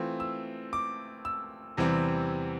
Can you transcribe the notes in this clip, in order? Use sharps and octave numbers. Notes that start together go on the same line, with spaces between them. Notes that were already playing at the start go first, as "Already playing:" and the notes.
Already playing: E3 A3 C4 F4
E6
D6
E6
E2 C3 E3 G3 C4